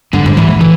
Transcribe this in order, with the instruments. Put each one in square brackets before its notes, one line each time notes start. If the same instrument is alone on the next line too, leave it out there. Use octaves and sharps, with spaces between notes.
[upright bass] G2 [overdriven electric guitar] D3
[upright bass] G#2
[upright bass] G#2 [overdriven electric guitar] E3
[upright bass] A#2
[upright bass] A#2 [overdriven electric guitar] E3